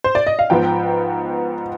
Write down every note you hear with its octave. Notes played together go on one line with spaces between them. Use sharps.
C5
D5
D#5
F5
G#2 F3 B3 G5